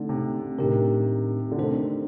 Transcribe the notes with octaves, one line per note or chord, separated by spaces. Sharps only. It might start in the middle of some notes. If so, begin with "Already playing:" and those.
Already playing: D3 A3 C4 D#4
C3
A2 C3 D#3 A3 D4 G4 A#4
D3
C3 D#3 A3 D4 A4 C5